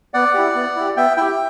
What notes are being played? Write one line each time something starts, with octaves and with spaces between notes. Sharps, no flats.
B3 D5 F#5
E4 G4
B3
E4 G4
B3 E5 G5
E4 G4 E5 G5